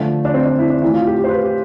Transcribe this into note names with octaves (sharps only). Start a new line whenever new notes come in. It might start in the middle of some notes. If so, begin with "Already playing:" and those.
Already playing: D3 F3 A3
D4
C4
D4
E4
D4
A2 E3 A3 E4
F4
G4
G4
C5
B4
G4